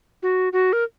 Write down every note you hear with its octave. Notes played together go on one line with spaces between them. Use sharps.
F#4
F#4
A#4